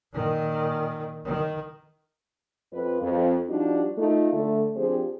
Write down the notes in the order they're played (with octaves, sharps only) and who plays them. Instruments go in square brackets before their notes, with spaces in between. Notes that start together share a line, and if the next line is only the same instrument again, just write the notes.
[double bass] A#2 D#3
D#3
[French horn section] F2 B4
F2
F3 G3 D4 D#4 F#4 G4
A3 D#4 F4
D3 A3
F3 C4 D4 G4 G#4 C5